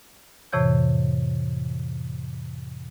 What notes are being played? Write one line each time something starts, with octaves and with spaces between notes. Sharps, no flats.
F2 A2 C3 E3 C#5 G6